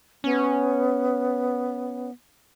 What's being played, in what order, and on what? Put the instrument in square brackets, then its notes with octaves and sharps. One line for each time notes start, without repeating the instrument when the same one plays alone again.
[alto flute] B3 [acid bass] C#4